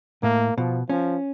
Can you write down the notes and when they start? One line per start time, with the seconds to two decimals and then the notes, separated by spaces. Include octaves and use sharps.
0.23 A2 A#3
0.58 B2 F3
0.90 F3 C#4